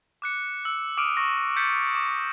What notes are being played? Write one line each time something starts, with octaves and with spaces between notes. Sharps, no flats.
D6 F#6 C#7
E6
D6 D#6 F6 D7 D#7
C#6 A#6
G6 A6 B6 C#7
D6